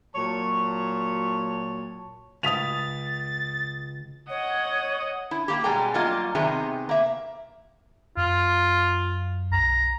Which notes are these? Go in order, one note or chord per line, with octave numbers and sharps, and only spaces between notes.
A#2 F#3 C#5 A5
C#2 D#6 A6 B6 F7
C#5 D#5 F#5
E4
A#3 G4
B2 G3 G#3 G#4 G5 A#5
F#3 G3 A#3 F4 D#5
C3 D#3 B3 G4 G#4
A#3 E5
F#2 F4
B1 A#5